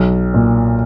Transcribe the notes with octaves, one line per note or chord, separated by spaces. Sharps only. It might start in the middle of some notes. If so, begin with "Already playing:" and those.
Already playing: B1
A#2